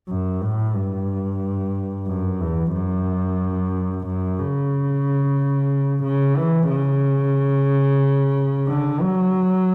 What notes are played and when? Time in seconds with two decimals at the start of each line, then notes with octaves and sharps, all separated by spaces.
0.09 F#2
0.42 A2
0.75 G2
2.07 F#2
2.41 E2
2.74 F#2
4.06 F#2
4.39 C#3
6.03 C#3
6.37 E3
6.70 C#3
8.68 D3
9.01 F#3